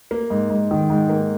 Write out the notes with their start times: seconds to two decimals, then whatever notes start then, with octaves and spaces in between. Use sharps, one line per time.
0.11 A#3
0.30 G#2
0.50 G#2
0.71 D#3
0.90 G#2
1.09 A#3